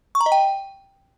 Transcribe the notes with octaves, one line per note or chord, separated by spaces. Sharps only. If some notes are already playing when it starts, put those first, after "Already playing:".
C#6
A#5
D#5
G5